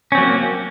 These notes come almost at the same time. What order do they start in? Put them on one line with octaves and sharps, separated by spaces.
C#4 C4 F#3 A#3